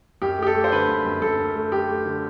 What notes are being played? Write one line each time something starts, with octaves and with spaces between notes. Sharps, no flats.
F#2 G4
A3 G4
A4
A3
C5
D3 B4
F#2
F#2
F#2 A4
F#2
A3
A3 G4
A3
D3